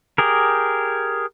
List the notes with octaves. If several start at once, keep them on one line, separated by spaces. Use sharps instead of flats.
G4 G#4 A#4